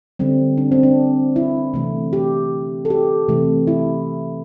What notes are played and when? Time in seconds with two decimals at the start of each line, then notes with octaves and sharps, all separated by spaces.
0.19 D3 G3 C4
0.58 D4
0.72 C4
0.83 D4
1.36 E4
1.74 C3 E3 A3
2.13 G4
2.85 A4
2.90 G4
3.28 C3 E3 A3
3.67 E4